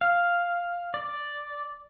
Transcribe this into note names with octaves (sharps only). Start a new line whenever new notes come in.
F5
D5